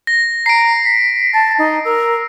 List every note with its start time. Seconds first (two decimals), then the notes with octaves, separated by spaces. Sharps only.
0.07 A#6
0.46 A#5 C7 D7
0.85 B6
1.34 A5 A6
1.58 D#4
1.85 A#4 E6